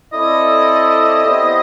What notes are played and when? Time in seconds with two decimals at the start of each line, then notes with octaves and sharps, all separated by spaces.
0.12 C4 E4 A4 D5 D#5
1.26 B3 E4 G4 C5 E5